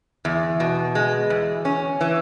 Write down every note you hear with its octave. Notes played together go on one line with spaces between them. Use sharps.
E2
B2
G#3
E2
C#4
E3